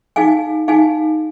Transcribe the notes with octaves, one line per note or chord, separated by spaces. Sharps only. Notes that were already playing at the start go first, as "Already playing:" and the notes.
D#4 G#4 F5 G#5
D#4 G#4 F5 G#5